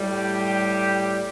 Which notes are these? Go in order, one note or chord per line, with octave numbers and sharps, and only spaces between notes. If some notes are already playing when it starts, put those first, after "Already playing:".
Already playing: A2 G3
G4